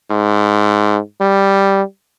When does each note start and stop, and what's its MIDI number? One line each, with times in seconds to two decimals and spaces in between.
0.11 0.98 44
1.21 1.82 55